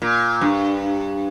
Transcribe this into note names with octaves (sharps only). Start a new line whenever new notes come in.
A#2
G2